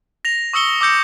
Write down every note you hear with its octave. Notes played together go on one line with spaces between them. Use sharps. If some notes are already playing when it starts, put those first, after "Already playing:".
A#6 F7
C#6 D#6 E6 C#7 G7
D6 E6 G6 C#7